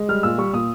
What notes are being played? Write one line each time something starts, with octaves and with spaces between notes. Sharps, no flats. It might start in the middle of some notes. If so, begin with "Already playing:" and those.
Already playing: G#3
G3 F6
A#2 E6
G3 C#6
A#2 D#6